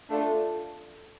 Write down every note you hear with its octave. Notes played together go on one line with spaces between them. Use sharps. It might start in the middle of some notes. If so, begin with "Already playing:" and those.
A3 D4 F4 A4